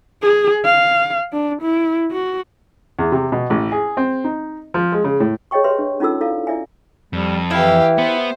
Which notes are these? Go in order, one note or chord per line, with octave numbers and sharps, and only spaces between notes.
G#4
F5
D4
E4
F#4
E2
C3
B2
A1
G#4
C4
D#4
F3
G#3
C#3
A2
G#4 C#5 D#5 G5 C#6
G4 B4 C#5 E5 C6
D4
C#4 D#4 F4 A4 E6
E4 A4 D5 F5
E4 D5 E5 G#5
F2 G3
E3 E4 G4 F5
B3 C5